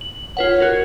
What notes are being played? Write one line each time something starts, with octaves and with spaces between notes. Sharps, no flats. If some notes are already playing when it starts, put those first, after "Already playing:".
F#7
F4 B4 C#5 F#5
F#4 A#4